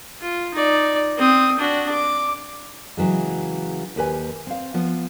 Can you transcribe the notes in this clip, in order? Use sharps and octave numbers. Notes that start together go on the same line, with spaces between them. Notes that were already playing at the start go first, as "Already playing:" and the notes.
F4
D#4 D5
C4 D#6
D4 F#4
D6
C#3 E3 F#3 G#3
D#2 G4 B4 G#5
C4 F5
F3 B3 C5